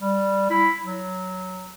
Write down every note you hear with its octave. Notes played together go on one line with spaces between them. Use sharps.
G3
E4
F#3